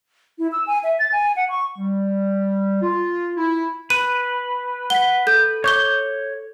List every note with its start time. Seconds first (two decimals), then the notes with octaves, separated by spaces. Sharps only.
0.39 E4
0.52 E6
0.67 G#5
0.84 E5
0.99 A6
1.12 G#5
1.36 F#5
1.49 C#6
1.77 G3
2.82 F4
3.37 E4
3.90 B4 D#7
4.90 F#5 B6 G7
5.27 A4 G6
5.64 C#5 C#6 D6 G6 G7